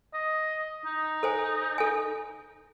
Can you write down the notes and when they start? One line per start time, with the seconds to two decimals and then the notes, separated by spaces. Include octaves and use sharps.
0.14 D#5
0.85 D#4
1.23 A4 C5 G#5
1.78 A4 G#5